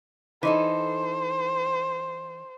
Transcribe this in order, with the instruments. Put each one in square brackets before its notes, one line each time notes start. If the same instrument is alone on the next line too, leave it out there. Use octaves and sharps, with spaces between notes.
[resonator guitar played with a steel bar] E3 D#4 A4 [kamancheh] C5